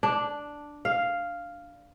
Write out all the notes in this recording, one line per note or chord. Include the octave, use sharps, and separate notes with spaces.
D4
F5